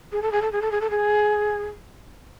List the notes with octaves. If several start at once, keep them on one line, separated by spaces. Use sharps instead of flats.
G#4
A4
G#4
A4
G#4
A4
G#4
A4
G#4